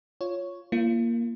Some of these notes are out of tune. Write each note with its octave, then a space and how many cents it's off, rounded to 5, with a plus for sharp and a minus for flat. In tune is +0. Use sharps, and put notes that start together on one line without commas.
F4 +0 C#5 +0
A#3 +0 F4 -35